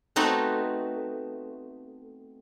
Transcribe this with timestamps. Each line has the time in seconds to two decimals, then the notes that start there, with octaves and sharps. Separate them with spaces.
0.16 A3 B3 C4 D#4 F#4